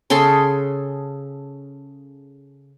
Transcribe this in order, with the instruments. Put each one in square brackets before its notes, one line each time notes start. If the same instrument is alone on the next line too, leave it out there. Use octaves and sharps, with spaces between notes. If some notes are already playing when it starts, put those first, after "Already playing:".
[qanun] C#3 G#4 A4 C6